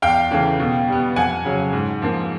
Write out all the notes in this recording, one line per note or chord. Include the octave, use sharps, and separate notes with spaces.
E2 F5 G5
C#3 E3 A3
B2
G3 B3
F2 F#5 G#5
C#3 F#3
G#2
F3 A#3